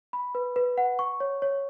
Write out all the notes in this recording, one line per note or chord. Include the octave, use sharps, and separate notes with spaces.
B5
B4
B4
F#5
C#6
C#5
C#5